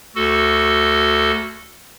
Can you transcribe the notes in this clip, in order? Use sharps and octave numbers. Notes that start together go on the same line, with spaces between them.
D2 F#4 A4